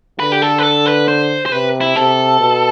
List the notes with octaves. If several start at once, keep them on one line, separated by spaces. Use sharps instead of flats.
D3 B4
G4
A4
B4
A4
B4
C5
C5
C3 B4
E4
C3 A4
B2